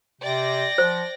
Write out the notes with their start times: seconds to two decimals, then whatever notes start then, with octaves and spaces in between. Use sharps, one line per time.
0.21 C3 D5 G5 A#6
0.78 F3 C5